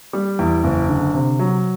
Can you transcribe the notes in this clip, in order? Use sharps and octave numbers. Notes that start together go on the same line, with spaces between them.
G3
E2
F#1
D3
C3
F#3